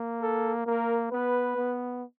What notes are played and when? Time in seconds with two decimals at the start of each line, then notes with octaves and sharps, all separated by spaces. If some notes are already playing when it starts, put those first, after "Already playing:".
Already playing: A#3
0.22 A4
0.66 A#3 A#4
1.12 B3 B4
1.56 B3